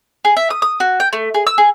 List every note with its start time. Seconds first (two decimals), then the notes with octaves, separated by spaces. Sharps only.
0.25 G#4
0.37 E5
0.50 D#6
0.62 D#6
0.80 F#4
1.00 G5
1.13 A3
1.34 G#4
1.47 E6
1.58 G#4